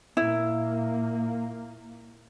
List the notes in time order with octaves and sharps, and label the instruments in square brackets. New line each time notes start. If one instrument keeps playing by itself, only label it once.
[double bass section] A#2 A#3 [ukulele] E4